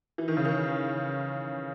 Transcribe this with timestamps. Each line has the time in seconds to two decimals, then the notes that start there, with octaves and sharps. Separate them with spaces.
0.18 E3
0.28 D#3
0.37 C#3
0.45 D#3